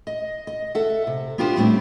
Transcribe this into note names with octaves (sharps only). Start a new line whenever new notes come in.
D#5
D#5
A4 E5 F#5
C3
B3 D4 F4 G4 B4 C5
D#2 A2 G3 B3 C4 D4